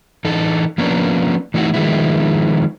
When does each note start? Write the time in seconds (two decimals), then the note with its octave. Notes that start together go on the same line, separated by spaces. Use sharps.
0.25 E3 D#4 A4
0.78 F3 A#3 B3 C#4 D4
1.54 E3 A3 D#4 E4 F#4
1.74 D#3 F3 G#3 B3 E4